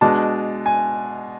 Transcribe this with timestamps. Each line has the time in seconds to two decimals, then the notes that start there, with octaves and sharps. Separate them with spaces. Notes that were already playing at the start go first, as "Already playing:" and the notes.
0.01 B2 G#3 D4 A5
0.66 G#5